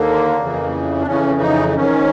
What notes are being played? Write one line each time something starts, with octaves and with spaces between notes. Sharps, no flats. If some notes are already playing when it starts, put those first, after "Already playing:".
Already playing: D#2 D3 A#3
F2 C#3 E3
D4
F2 C#3 E3 C#4
D#4
G#2 D#3 C#4